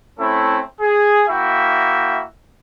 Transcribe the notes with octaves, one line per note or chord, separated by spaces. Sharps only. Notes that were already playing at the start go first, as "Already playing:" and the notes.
A3 C4 C#4 E4 A4
G#4
A#3 E4 F#4 E5 G5